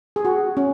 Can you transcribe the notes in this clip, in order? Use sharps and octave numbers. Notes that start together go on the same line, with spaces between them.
G#4
F#4
C#4